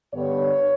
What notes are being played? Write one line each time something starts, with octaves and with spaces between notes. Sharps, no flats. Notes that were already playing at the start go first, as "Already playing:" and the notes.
G2 D3 G3 B3 C#5